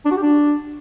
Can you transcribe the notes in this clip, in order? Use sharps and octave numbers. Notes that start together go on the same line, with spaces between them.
D4
F#4
G4
D4